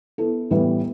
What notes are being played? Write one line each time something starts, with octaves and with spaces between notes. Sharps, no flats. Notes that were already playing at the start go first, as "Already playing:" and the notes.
B3 E4 A4
A2 E3 G3 B3